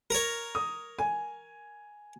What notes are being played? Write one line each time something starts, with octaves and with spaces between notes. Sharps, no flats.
A#4 C#5
D#6
G#5